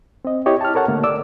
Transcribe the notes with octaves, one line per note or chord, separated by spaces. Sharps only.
C4 D#5
E4 G4 C#5 D#5
A5 F6
A4 A#4 C#5 F#5 A5
D3 A3 A#3
D5 D6 E6